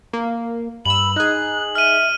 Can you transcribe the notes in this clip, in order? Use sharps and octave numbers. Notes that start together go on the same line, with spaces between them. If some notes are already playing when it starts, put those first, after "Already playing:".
A#3
G2 B5 E6 F#7
D#4 G#4 F#6
E5 F6 D#7